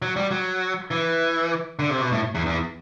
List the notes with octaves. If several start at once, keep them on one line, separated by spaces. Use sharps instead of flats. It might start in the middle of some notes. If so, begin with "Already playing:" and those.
F#3
G3
F#3
E3
D3
C3
B2
A2
E2
E2